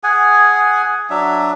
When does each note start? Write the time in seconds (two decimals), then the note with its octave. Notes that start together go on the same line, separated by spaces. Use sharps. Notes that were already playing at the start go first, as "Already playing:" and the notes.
0.04 G#4 F#5 G#5
1.10 F#3 D4 E5